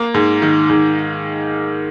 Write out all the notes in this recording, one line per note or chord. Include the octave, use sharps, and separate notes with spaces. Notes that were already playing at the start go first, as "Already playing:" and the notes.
Already playing: A#3
G#2
D#3
G#2